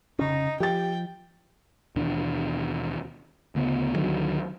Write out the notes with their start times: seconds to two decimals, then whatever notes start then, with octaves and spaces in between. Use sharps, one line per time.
0.19 F1 C#3 C#4 D#4
0.60 F3 G4 G5 A6
1.96 D#2 B2 E3 D4
3.55 D2 C#3 B3
3.95 D2 D3 D#3 F#3